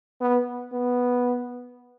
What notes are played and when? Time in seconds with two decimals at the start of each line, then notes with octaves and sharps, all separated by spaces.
0.21 B3
0.73 B3